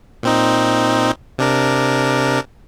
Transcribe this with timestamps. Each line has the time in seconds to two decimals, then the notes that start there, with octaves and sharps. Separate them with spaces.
0.23 A#2 C4 D#4
1.38 C3 D4 A#4